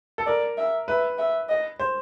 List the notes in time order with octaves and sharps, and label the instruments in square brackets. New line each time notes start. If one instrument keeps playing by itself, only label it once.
[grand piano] A4
[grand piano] A#4 [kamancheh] D5
[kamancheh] E5
[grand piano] B4 [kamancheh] E5
[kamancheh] E5
D#5
[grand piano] C5